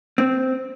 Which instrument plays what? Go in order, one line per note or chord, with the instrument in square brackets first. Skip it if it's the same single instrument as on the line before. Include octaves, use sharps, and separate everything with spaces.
[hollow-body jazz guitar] C4